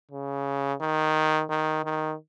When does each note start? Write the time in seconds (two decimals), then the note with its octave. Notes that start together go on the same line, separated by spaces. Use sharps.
0.11 C#3
0.81 D#3
1.50 D#3
1.84 D#3